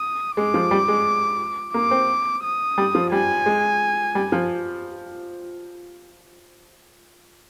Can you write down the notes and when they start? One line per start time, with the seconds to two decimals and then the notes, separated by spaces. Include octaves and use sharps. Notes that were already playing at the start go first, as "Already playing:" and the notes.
Already playing: D#6
0.37 G#3 D6
0.54 F3
0.71 G3
0.88 G#3
1.74 A#3 D6
1.91 C4
2.43 D#6
2.78 G3
2.95 F3
3.12 G3 G#5
3.46 G#3
4.15 G3
4.32 F3